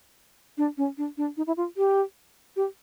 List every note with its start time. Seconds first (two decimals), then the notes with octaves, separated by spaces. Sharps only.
0.58 D4
0.78 C#4
0.98 D4
1.17 D4
1.37 D#4
1.47 E4
1.57 F4
1.77 G4
2.56 G4